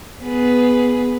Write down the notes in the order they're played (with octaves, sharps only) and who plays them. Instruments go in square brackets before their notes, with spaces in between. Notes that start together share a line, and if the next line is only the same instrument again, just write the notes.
[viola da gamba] B3 G#4 B4